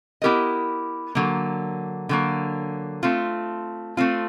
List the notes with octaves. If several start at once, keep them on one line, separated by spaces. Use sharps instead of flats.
B3 E4 G4 A#4 D#5
D3 F#3 A#3
D3 F#3 A#3
A3 C4 F4
A3 C4 F4